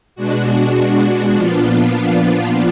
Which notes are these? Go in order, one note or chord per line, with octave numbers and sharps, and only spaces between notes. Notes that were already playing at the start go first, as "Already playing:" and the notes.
B2 G#3 D4 F#4
F#4
A#2 F3 B3 D4 F4